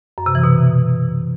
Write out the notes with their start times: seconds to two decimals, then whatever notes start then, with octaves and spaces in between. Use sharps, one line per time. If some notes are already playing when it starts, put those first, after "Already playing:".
0.18 F#2
0.26 C3
0.35 E3
0.44 B2